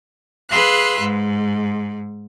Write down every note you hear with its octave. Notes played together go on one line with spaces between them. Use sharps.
G#4 B4 F5 C6 E6 F#6
G#2